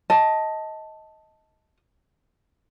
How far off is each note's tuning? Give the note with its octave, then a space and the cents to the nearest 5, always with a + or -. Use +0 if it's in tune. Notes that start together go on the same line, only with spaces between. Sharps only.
D#5 +20 A5 +0